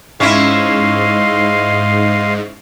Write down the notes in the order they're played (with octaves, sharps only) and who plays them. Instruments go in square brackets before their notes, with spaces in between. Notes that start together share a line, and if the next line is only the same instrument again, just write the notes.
[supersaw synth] G#2 [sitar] C#4 E4 [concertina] D#5 F5 C6